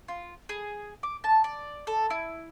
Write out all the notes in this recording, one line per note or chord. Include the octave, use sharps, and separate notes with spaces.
F4
G#4
D6
A5
D5
A4
E4